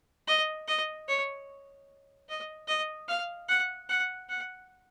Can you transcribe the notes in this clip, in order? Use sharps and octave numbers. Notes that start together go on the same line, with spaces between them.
D#5
D#5
C#5
D#5
D#5
F5
F#5
F#5
F#5